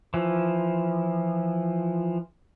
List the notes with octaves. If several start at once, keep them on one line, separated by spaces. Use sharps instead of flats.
E3 F3